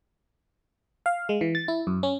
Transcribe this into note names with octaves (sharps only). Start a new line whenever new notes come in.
F5
G#3
E3
A6
E4
F#2
C#4